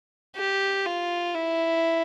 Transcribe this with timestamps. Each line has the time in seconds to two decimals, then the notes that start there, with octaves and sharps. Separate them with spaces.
0.36 G4
0.86 F4
1.35 E4